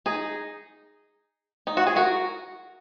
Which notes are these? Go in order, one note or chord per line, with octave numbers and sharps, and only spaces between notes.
D#4 G#4
D#4
F#4
G#4
F#4 A#4